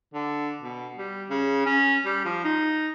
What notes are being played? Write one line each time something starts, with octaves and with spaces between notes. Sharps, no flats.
D3
B2
G3
C#3
C#4
G3
F3
D#4